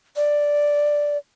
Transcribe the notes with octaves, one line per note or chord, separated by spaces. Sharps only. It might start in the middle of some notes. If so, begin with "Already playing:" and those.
D5